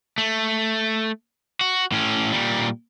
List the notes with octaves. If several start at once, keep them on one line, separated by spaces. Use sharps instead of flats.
A3
F#4
A2 C#4
A#2 G3